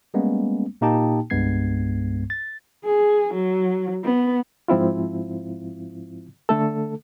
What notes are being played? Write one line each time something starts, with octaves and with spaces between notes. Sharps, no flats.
G3 G#3 A#3 B3 C#4
A#2 A#3 D#4 G4 G5 A5
C2 G2 G#3 B3 G#6 C7
A6
G#4
F#3
B3
G#2 F3 C4 E4 F4
D3 A3 A4